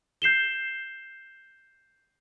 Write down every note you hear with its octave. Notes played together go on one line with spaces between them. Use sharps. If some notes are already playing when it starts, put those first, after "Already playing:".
G6 C7 E7 G7